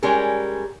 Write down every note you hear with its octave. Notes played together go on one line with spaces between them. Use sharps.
G3 G#3 C#4 G#4 A#4